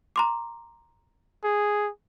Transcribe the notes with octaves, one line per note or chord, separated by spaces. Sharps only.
A#5 C6 D6
G#4